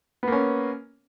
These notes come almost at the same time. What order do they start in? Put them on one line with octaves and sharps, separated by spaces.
B3 A#3 C#4